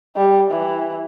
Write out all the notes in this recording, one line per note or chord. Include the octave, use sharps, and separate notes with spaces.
G3
E3